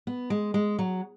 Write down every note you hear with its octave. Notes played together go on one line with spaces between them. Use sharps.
B3
G#3
G#3
F#3